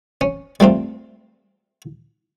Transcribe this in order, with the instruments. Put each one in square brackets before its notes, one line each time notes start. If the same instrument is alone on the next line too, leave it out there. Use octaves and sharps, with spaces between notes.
[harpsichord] C#4
G3 A3 C4 F4